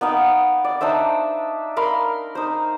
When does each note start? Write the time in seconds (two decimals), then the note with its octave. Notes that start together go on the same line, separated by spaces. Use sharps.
0.01 B3 D#4 F5 G5
0.64 D5
0.81 D4 D#4 C5 E5
1.77 A#4 F5 B5 C6
2.35 D#4 C5